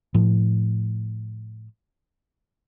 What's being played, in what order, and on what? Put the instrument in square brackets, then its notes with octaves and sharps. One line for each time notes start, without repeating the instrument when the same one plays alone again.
[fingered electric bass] A2 F3